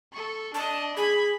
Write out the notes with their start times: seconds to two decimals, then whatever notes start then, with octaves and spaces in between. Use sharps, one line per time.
0.13 A4 C#6
0.54 D4 D#5 A5
0.97 G#4 B5 G#6